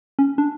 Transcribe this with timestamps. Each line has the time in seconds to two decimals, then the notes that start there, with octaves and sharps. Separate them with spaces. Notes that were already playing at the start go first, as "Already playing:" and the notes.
0.19 C#4
0.38 D4